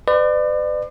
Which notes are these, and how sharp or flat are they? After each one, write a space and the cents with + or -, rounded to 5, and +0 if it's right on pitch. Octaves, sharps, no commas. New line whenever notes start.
B4 +40 D5 +35